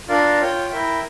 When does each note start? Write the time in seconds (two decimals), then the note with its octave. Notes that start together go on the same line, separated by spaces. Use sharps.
0.08 D4 F4 A#4 D5 F5
0.39 F4 C#5 G5
0.70 E4 A#4 E5 G5